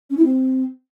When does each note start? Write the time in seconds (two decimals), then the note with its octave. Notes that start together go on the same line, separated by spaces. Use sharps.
0.10 C#4
0.17 E4
0.25 C4